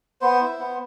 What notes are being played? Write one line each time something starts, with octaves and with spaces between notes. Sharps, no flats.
B3 C5
E4
B3